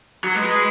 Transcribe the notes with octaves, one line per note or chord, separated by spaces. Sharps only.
F#3
G#3 B4